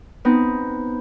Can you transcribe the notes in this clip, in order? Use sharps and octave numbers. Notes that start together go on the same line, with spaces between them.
B3 C4 D#4